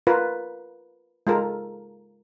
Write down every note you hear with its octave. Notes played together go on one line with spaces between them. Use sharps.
F4 A#4 B4
G#3 F4 A4 A#4